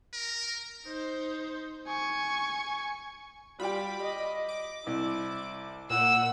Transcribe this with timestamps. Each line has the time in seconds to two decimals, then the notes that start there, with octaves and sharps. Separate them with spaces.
0.13 A#4
0.87 D#4 C5
1.87 G#5 C#6
3.60 G3 F4 G5 B5 D6
4.03 D#5
4.49 D6
4.87 C2 E4
5.90 A#2 F#5 E6